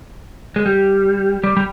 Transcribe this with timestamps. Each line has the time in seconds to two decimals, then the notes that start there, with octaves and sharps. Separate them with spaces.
0.56 G#3
0.66 G3
1.44 G3
1.57 G3